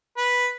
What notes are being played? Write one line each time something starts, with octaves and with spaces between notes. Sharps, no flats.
B4